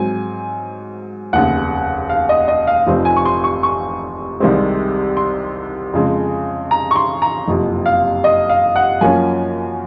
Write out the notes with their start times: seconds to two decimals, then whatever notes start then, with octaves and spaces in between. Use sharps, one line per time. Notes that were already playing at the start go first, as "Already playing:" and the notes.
Already playing: G#2 F#3 C4 G#5
1.33 F1 D#2 C#3 F#5
2.09 F5
2.29 D#5
2.48 D#5
2.67 F5
2.86 F1 F2 C3 F3 C4
3.05 G#5
3.16 C#6
3.25 C6
3.44 C#6
3.63 C#6
4.40 C2 C3 D#3 G#3 C4
5.17 C6
5.93 F2 C#3 G#3
6.71 A#5
6.91 C#6
6.96 C6
7.22 A#5
7.48 F#1 F2 C3
7.86 F5
8.24 D#5
8.49 F5
8.76 F#5
9.01 F#2 F3 A#3 C#4 G#5